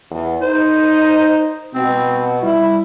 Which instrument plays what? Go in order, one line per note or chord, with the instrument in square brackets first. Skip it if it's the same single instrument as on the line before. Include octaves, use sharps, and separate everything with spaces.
[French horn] E2
[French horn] D#4 [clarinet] C5
[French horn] B2 [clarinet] C4
[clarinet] G3 [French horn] E4